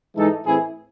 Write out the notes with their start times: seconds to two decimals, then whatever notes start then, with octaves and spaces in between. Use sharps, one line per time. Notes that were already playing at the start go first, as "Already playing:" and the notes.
0.16 G#2 E3 G#3 D#4 A4
0.46 A2 E3 C4 E4 G#4